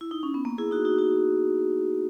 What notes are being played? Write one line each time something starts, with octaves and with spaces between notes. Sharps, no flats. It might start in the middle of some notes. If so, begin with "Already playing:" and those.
E4
D#4
C#4
B3
A#3
E4 G#4
D#4 F#4
D#4 F#4
D#4 F#4